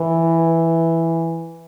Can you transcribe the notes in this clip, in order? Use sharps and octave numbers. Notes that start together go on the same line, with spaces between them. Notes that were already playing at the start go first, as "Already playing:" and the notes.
Already playing: E3